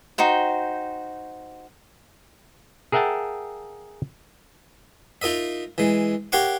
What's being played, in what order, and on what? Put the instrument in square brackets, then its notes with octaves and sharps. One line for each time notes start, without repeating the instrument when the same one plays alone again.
[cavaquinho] D#4 F#4 C5 G5
[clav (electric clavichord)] G#4 A#4 E5 F#5 G5 A5
[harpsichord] D#4 F4 A#4 D#5 E5
E3 G#3
G4 A#4 C#5 F5 F#5 C#6